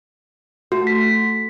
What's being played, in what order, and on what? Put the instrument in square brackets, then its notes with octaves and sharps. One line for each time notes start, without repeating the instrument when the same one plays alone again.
[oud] A3 [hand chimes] F#4
[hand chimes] B6